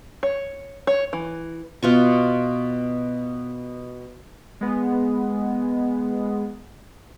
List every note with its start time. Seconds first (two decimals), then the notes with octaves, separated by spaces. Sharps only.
0.23 C#5
0.87 C#5
1.13 E3
1.83 B2 F4 C#6
4.61 G#3 B3